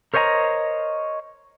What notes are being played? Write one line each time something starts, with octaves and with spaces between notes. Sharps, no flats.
A#4 C5 C#5 D#5 G5 A#5